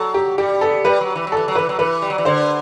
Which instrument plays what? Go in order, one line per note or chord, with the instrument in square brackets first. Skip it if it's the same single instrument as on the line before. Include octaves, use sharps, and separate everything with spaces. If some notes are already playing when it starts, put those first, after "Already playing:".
Already playing: [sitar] F#3 [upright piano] A4
[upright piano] G4
[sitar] G3 [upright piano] G4
[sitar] B3 [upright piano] A4
[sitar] G3 [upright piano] B4
[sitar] F#3
E3
F#3
[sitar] E3 [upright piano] A4
[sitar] F#3
[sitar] E3 [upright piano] B4
[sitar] F#3
[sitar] E3 [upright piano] B4
[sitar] G3
F#3
E3
[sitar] D3 [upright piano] C5